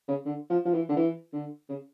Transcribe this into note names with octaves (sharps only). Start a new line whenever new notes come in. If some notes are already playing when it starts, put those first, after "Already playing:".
C#3
D3
F3
F3
E3
D3
E3
D3
C#3